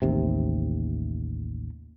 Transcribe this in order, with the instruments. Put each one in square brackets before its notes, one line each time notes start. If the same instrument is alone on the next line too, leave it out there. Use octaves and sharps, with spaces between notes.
[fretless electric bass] A1 D#2 C3